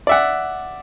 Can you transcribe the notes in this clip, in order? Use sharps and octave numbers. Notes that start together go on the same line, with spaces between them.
D5 E5 F#5